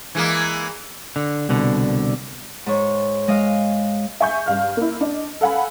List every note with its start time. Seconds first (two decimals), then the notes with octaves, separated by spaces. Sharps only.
0.15 E3 G#3 A#3
1.16 D3
1.49 C2 B2 D3
2.66 G#2 C#5
3.28 G#3 D#5 F5
4.20 E5 G#5 C#6 G6
4.46 G2 F5 F6
4.77 A#3 E4
5.01 D4 D#5
5.41 A4 F5 F#5 G#5 B5